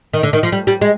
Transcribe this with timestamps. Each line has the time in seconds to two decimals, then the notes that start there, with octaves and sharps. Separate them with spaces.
0.13 D#3
0.23 D3
0.33 D#3
0.43 F3
0.52 G3
0.67 G3
0.81 G#3